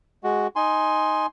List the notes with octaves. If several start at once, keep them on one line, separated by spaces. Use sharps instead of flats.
G#3 F#4
D#4 G#5 C6